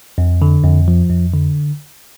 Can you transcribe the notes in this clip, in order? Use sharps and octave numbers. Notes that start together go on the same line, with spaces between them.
F2
D3
F2
F3
F2
D3